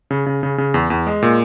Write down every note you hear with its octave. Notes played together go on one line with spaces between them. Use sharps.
C#3
C#3
C#3
C#3
E2
E2
G#3
A#2